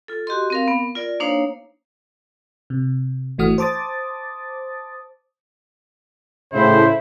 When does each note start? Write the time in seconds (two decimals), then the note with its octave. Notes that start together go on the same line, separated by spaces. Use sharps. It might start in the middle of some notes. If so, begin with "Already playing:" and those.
0.08 F4 A4
0.27 F#4 G4 D#5 C6
0.50 C4 A#4 F5
0.68 B3
0.95 F4 A#4 D5
1.20 A#3 D4 D#4 C5 C#5 F5
2.70 C3
3.38 G1 E3 A3 F#4 D#6 F6
3.58 C5 A5 D6 D#6 A6
6.53 A2 C#3 E4 C5